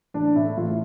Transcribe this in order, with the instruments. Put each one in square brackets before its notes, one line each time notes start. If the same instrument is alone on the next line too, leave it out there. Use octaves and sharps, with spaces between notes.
[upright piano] A1 D4
A2 E4
A1 F4